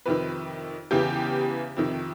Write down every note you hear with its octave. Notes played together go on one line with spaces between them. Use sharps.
F2 C3 D#3 B4
E2 C#3 E3 G4
F2 C3 D#3